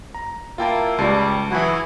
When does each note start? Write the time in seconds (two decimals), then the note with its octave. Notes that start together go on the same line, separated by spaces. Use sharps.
0.14 A#5
0.58 A#3 E4 F4 G5 A5
0.98 C#2 G3 A5 C7
1.51 E3 F#3 E4 F#4 G#4